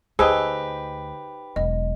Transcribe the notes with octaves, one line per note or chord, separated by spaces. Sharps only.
D2 D#4 G4 G#4 B4 C5 A5 E6
E1 F#3 D#5